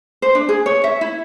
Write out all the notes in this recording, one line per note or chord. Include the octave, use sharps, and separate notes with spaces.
C5
D4
G#4
C#5
E5
E4